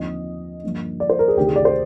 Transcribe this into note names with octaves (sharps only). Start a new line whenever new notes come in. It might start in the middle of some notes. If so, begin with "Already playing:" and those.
Already playing: D#2 D3 F3 C4 D#5
G2 D3 F3 A#3 D4
D5
C5
A#4
G#4
D2 C3 D#3 G4
G#4
D5
C5